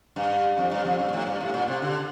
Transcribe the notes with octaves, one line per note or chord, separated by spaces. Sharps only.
G2
F2
G2
F2
G2
A#2
A2
G2
A2
A#2
C3
D3